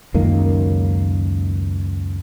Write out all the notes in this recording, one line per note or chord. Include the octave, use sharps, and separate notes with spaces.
C#2 F#2 D#3 A#3